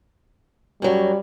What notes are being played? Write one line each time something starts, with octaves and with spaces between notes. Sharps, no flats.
F#2 F#3 G3